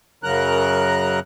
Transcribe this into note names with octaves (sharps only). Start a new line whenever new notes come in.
F#2 C#3 F#3 A#4 A#5 F#6